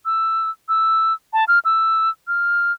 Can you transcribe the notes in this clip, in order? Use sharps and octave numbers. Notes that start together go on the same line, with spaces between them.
E6
E6
A5
F6
E6
F6